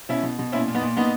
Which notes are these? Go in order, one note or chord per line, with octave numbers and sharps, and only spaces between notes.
B2 C#4 E4
B2
B2
A#2 C#4 E4
A#2
B3 D#4
A#2
A#2 B3 D#4